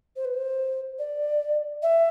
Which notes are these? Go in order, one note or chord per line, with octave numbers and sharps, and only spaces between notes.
C5
B4
C5
D5
E5